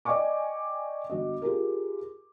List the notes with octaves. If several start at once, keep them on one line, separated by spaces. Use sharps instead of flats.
D5 D#5 G5 G#5 C#6 D6
G1 F#4 D#5
F4 G4 G#4 A#4